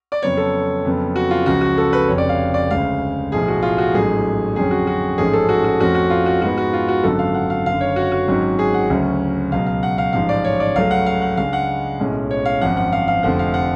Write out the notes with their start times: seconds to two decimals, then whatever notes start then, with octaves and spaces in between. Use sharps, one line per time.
0.12 D5
0.22 F2 C#3 F#3 B3 C#5
0.37 A4
0.85 F2 C#3 F#3 B3
1.16 F#4
1.31 F4
1.46 C#2 C#3 F3 F#4
1.61 F#4
1.78 A4
1.93 B4
2.08 F1 F2 C#3 C#5
2.18 D5
2.29 F5
2.54 D5
2.71 D2 C#3 G#3 F5
3.32 B1 A2 F3 G#4
3.48 F#4
3.63 F4
3.78 F#4
3.93 A1 G#2 F#3 A3 G#4
4.56 F2 D3 F#3 C#4 G#4
4.71 F#4
4.87 F#4
5.18 A1 G#2 F3 A3 C#4 G#4
5.33 A4
5.49 F#4
5.64 F#4
5.80 F2 F3 A3 C#4 F#4
5.95 F#4
6.10 F4
6.26 F#4
6.41 G#2 G#3 B3 F#4
6.58 F#4
6.73 F4
6.88 F#4
7.04 G#1 F#2 D3 F#3 A3 A4
7.19 F5
7.34 F#5
7.50 F5
7.66 F#1 F#2 D3 F5
7.81 C#5
7.96 F#4
8.12 F#4
8.28 G#1 G#2 F#3 C#4
8.59 G#4
8.74 F#5
8.90 D2 C#3 F#3 C#4
9.51 C#2 B2 F#3 F5
9.66 F5
9.83 F#5
9.98 F5
10.13 A1 G#2 F3 F5
10.29 D5
10.44 C#5
10.60 D5
10.75 C#2 C#3 F#3 A3 C#4 F5
10.91 F#5
11.06 F5
11.22 F#5
11.37 C#2 C#3 G#3 D4 F5
11.53 F#5
11.99 B1 A2 G#3 C#4
12.31 C#5
12.45 F5
12.61 G#1 F#2 F3 F#5
12.77 F#5
12.93 F5
13.08 F5
13.23 F1 F2 D3 F3 A3 F#5
13.39 F5
13.54 F#5